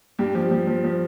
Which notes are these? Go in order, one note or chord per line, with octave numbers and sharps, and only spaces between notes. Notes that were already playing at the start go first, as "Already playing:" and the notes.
G2 G4
F3 G4
F3
F3
F3